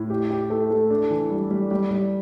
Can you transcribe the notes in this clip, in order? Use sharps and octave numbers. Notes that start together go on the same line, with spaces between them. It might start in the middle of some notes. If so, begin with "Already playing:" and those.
Already playing: A2
G4
G4
A3
A3
D4
E3
G3
G3
G3
G3